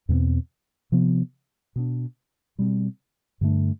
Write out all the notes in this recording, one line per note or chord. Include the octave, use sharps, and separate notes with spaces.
E2 B2 A3 C4
C3 F3 B3
B2 B3 D4
B2 G3 C4
G2 D3 A3 D4